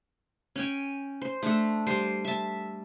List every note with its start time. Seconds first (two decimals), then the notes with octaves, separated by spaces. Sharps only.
0.56 C#4 G5 G#5
1.22 C5
1.43 A3 D4 A4
1.87 G3 C5 C6
2.25 E5 A5